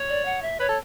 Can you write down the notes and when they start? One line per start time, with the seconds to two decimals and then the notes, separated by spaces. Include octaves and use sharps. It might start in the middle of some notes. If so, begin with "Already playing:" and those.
Already playing: C#5
0.09 D5
0.25 F#5
0.42 E5
0.60 B4 C#5
0.69 A4